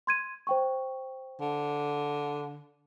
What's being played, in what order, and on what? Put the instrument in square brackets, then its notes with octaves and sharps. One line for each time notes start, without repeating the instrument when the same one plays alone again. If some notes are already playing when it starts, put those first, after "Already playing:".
[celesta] C6 G#6 D#7
C5 G5 C#6
[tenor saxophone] D3